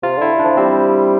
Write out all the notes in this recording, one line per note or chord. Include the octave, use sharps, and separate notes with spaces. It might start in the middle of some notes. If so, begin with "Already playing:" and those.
C3 F4
D3 E4
D4
F3
G3 C4